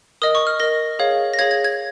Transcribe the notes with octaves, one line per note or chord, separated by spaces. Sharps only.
A#4 D#5 D#6
C#6
F6
A#4 D#5 A#6
G#4 C#5 F5
A#6
G#4 C#5 F5 G#6
G#6
G#6